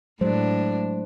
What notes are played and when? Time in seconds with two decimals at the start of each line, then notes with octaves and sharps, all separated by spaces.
0.21 A2 F#3 G#3 D4 C5